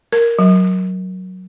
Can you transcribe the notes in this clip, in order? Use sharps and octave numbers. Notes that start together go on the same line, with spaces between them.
A#4
F#3